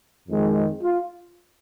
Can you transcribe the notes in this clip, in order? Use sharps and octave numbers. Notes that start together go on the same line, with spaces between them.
F2 D#3 G#3
F4